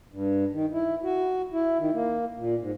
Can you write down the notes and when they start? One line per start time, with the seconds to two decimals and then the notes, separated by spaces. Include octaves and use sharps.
0.12 G2
0.53 D#3
0.73 E4
1.03 F#4
1.53 E4
1.79 D#3
1.94 A#3
2.38 A#2
2.61 G#2